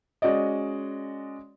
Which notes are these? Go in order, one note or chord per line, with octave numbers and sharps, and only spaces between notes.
G#3 C#4 F#4 D5 D#5